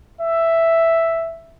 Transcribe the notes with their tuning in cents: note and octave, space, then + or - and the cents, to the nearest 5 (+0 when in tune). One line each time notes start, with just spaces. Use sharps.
E5 +5